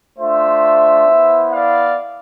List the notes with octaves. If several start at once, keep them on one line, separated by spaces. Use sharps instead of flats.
A3 D4 F4 C5 E5
B3 E4
D5 F5